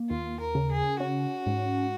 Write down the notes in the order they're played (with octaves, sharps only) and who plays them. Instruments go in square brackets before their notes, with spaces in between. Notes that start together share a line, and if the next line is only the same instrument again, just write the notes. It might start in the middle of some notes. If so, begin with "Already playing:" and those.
Already playing: [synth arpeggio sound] A#3
[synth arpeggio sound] D#2 [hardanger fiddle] F4
[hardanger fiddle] A#4
[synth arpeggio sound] C#3
[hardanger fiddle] G#4
[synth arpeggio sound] C#4 [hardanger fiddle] F#4
[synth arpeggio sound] G#2